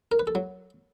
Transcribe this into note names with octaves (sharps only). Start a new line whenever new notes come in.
A#4
B4
A4
F#3